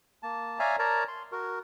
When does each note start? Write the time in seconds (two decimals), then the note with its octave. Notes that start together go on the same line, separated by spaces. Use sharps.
0.23 A#3 A5
0.59 C#5 D5 E5 F5 G#5 A#5
0.79 A#4 C#5 D5 A5 A#5
1.08 C6
1.32 F#4 A#4